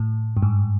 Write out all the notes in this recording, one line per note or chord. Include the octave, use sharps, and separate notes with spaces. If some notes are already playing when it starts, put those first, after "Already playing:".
Already playing: A2
G2
G#2